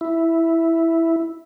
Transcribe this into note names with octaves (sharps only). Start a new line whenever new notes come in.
E4